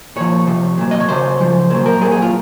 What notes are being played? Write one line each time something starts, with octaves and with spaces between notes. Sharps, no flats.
A#2 F3 C#5
C3 F3
A#2 F#3
D#5
C#5
C#3 F#3 C5
C#3 F3
A#2 F#3 C5
A#4
A#2 F#3 G#4
G#4
F4